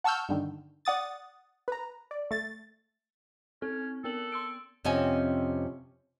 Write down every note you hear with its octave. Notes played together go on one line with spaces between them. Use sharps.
F#5 A5 C#6 E6 F6 G6
G2 D3 D#3
D5 F#5 D#6 A6
B4 A#5
D5
A3 A6
C4 C#4 A4
B3 A4 A#4 F#7
C6 E6 D7
F2 C3 C4 C#4 D#5 G#5